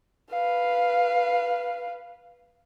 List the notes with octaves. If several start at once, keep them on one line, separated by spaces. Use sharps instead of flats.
B4 F5